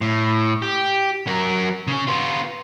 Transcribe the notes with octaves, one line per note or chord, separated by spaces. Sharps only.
A2
G4
F#3 A#4
C#3 C#4
B3 F4